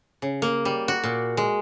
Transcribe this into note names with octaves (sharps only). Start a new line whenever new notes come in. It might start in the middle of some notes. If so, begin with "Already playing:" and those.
C#3
A#3
G3
F#4
A#2
G#3